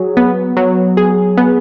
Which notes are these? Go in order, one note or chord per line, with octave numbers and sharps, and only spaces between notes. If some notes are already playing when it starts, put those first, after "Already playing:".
Already playing: F#3 G#4
B3
F#3
G#4
B3